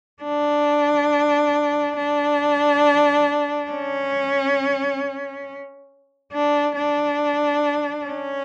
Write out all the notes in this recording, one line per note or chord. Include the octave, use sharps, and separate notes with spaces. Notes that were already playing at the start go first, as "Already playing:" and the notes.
D4
D4
C#4
D4
D4
C#4